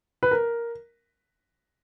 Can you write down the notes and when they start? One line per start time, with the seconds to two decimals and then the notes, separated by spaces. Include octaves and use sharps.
0.23 B4
0.31 A#4